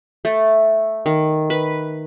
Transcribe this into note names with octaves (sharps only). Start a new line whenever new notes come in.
A3
D#3
B4